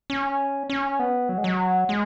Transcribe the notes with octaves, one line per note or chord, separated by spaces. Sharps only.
C#4
C#4
B3
F#3
G#3
F#3
G#3